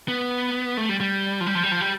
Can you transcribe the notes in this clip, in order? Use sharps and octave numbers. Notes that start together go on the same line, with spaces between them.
B3
A3
G3
G3
F3
G3
F3
G3
F3
G3